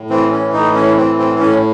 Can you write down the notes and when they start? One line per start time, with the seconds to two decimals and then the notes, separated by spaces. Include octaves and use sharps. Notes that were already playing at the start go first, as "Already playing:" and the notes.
Already playing: A2
0.10 E3 C4
0.32 C#4
0.53 A2 D#4
0.75 C#4
0.97 E3 C4
1.19 C4
1.40 A2 C#4